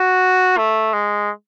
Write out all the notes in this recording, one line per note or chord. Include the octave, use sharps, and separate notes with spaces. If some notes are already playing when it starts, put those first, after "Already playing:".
Already playing: F#4
A3
G#3